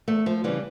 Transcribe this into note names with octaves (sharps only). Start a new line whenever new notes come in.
E2 A3
F3
C#3 E3 G3